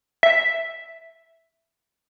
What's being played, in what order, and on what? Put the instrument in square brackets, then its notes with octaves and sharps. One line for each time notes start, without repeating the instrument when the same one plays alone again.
[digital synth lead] E5